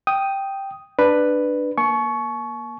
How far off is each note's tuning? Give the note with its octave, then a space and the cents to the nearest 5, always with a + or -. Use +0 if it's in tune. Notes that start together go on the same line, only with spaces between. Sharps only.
G5 +0 D#6 +0
D4 +15 B4 +0
A#3 +25 A5 -45 C#6 +5